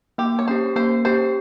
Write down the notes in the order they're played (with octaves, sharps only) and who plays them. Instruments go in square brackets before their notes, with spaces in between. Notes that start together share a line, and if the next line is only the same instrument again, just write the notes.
[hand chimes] A#3 [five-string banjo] G4
[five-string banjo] C#5
[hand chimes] C#4 G4 [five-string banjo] C5
[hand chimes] A#3 [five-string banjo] C5
[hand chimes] C#4 G4 [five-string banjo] C5